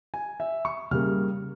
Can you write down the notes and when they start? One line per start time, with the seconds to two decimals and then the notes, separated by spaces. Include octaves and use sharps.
0.14 G#5
0.40 E5
0.65 C#6
0.91 C#3 G3 A#3 F6